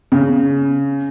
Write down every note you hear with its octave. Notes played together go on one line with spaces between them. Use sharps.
C#3